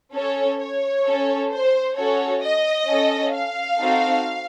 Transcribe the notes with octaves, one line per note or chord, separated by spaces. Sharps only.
C#4 A4 C#5
C#5
C#4 A4
C5
C#4 F#4 A4 C#5
D#5
C#4 A4
F5
C4 D#4 F#4 A4